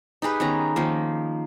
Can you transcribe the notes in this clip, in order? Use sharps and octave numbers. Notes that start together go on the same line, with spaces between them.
D#4 G4 G#4 B4
D#3 B3 C#4 A#5
D#3 F3 A#3